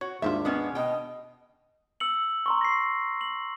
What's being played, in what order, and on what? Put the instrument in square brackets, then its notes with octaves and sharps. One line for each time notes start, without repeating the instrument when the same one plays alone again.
[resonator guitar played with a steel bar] F#4 [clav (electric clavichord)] C#5
[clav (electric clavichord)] D#2 G#2 F4 [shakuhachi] D4 [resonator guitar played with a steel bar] E5
[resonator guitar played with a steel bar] G#3 B3 C#4
[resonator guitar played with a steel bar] B2 G5 [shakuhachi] D#5
[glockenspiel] E6 C#7 F#7
A#5 C6 C#6
A#6 C7
F#7